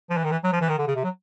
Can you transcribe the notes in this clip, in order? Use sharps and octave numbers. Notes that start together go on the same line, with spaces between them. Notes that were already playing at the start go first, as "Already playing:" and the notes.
F3
E3
D#3
E3
F#3
F3
E3
D#3
D3
C#3
C3
F#3